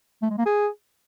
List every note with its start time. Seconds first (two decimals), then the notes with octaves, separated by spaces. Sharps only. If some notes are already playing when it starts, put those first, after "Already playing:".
0.22 A3
0.30 G#3
0.38 A#3
0.46 G#4